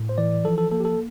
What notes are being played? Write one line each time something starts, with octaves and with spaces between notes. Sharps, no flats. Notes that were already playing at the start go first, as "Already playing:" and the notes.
Already playing: A2
C5
E3 D5
F3 A4
A4
A#3 A4
G4
A4